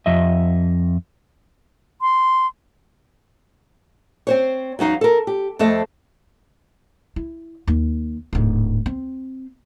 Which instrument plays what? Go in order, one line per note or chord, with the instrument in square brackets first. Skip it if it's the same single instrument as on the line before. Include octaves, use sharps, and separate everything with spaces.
[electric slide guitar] F2 D#5 E5
[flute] C6
[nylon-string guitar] C4 C5 C#5
E2 F#3 D#4 F5
A4 A#4
G4
F2 A3 C4 A4 D#5
[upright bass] E4
D#2
D1 G#2
C4